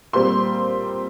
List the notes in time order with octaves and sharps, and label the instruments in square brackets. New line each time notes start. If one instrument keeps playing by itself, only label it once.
[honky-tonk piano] A#2 G3 C4 C6